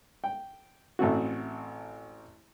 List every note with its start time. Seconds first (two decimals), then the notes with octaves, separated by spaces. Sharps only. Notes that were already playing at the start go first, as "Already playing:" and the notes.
0.24 G5
0.99 A1 A3 C4 F#4